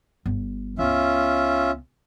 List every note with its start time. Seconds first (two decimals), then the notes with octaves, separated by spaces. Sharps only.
0.26 G1
0.78 C#2 B3 C#4 F4 E5